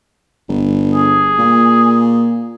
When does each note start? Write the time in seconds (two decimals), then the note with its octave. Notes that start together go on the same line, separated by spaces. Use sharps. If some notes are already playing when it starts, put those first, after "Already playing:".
0.49 G1
0.94 G#4
1.38 A#2